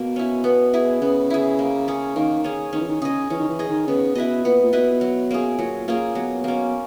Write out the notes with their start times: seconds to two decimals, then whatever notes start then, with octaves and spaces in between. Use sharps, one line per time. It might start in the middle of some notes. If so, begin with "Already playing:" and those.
Already playing: B2 A#3
0.16 C#4 E4
0.44 B3
0.74 E4 G#4
1.01 C#3 B3
1.30 E4 G#4
1.59 A#3
1.88 C#4 G#4
2.16 D#3 A#3
2.44 C#4 G#4
2.73 D#3 C#4
2.80 E3
2.88 D#3
3.01 C#3 G#4 D#5
3.30 E3 C#4
3.40 D#3
3.49 E3
3.59 G#4 D#5
3.68 D#3
3.87 C#3 B3
4.15 B2 E4 B4 D#5
4.44 A#2 B3
4.63 A#2
4.73 B2 E4 B4 D#5
5.01 F#3
5.31 A#3 C#4 G#4
5.59 A#2 F#3
5.88 A#2 A#3 C#4 G#4
6.15 B2 F#3
6.44 B2 A#3 C#4